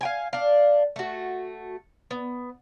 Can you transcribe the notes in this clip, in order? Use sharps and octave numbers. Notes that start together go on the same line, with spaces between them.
F5 G5 G#5
D4 F5
A3 F#4
B3